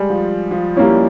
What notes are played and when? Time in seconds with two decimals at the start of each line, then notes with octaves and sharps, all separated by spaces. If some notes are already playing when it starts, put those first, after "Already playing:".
Already playing: G3 G#3
0.10 F3
0.51 F3
0.76 G3 A#3 C#4 E4